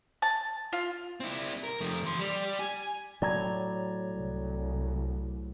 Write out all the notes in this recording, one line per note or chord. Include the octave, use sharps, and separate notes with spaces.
A5
F4
C4 E4
A#4
F2 A3
E3 C6
G3
G#5
A2 F#3 D5 A#5 G#6
C2